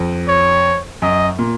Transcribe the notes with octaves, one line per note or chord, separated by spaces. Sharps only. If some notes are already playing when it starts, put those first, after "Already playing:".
Already playing: F2
C#5
F#2 D#5
A#2